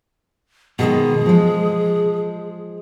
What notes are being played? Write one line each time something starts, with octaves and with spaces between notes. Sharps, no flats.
B2 D#3 G#3 G#4
F3 G#3